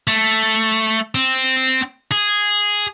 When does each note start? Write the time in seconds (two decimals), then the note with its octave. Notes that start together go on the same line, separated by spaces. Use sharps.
0.08 A3
1.15 C4
2.12 G#4